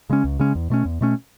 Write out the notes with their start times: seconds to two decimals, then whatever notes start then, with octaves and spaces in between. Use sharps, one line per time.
0.10 C#3 G#3 C#4
0.24 C#2
0.39 C#3 G#3 C#4
0.55 E2
0.70 B2 A3 C#4
0.85 E2
1.01 B2 A3 C#4